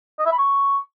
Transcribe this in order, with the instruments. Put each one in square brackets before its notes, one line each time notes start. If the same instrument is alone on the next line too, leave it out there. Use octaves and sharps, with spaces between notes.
[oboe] D#5
E5
B5
C#6